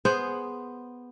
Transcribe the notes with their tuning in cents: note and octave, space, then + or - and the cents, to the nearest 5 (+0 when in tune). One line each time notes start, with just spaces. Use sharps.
B3 +0 G#4 +0 C5 +0